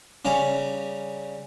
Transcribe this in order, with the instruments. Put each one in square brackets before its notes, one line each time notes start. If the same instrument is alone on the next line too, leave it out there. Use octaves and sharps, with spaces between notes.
[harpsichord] C#3 G3 C#4 A#5